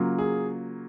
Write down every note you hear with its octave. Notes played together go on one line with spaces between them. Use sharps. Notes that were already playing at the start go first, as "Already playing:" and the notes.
Already playing: C#3 F#3 A#3 F4
G#4